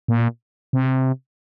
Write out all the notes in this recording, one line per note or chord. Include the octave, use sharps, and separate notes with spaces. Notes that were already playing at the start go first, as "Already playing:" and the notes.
A#2
C3